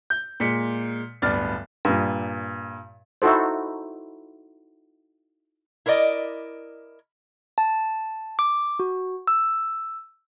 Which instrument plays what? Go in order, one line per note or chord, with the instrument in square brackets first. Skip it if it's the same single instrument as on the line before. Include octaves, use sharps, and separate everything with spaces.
[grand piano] G6
A#2 G#3 B6 C#7
D1 G2 B3 D5 F6 A6
[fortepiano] G2 A#2
[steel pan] D#4 E4 F#4 A4 C5
[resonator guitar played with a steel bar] E4 A#4 B4 D5 D#5
[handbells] A5
D6
F#4
E6